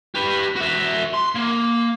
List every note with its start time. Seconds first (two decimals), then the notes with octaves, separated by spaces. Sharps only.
0.15 G4 B4
0.56 F#4 E5
1.13 C6
1.35 A#3